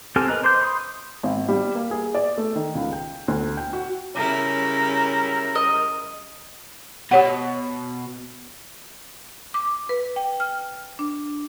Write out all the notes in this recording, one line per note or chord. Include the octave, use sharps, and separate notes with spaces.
C4 G4 A4 G#5 F6
A#4 B4 D#5 A#5 F#6
C5 C6 D6 G6
B5 C6 D#6
G#1
G3
A#3
G#4
D5
A3
D#3
C#2
G5
D2
G5
F#4
C#3 G3 C#4 E4 A#4 A#5
D#5
B2 G4 C#5 F#5
D6
B4
G5
F6
D4